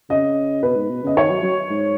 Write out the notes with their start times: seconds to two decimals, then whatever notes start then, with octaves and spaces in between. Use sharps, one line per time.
0.10 C#3 D#5
0.63 B2 B4
0.76 G#2
0.90 B2
1.04 C#3 D#5
1.16 D#3 C#5
1.30 F#3
1.43 F#3
1.70 G#2